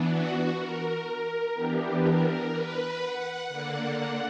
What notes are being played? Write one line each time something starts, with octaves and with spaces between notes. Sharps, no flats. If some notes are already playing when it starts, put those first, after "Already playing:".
Already playing: E3 B3 D4
F#4
A#4
E3 B3 D4 G4
A#4
B4
F#5
D3 A#3 D4 F#5
F#5